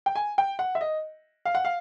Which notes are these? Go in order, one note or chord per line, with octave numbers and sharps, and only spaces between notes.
G5
G#5
G5
F#5
E5
D#5
F5
F#5
F5